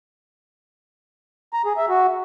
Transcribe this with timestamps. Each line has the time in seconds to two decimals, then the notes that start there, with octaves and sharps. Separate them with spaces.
1.53 A#5
1.65 G#4
1.77 E5
1.89 F#4